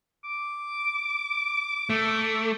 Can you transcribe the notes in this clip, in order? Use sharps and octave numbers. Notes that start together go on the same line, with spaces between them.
D6
A3